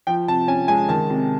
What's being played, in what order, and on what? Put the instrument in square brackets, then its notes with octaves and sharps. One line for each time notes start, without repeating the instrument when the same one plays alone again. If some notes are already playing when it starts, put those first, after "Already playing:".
[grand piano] F3 G5
C3 A5
C#4 G#5
G#3 G#5
D#3 A5
C3